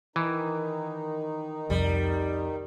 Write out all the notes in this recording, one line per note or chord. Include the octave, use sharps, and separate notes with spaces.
D#3 E3 D#4
C2 F2 G3